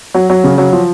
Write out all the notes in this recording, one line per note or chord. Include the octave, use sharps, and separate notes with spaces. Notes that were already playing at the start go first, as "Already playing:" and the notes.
F#3
F#3
C#3
F#3
F3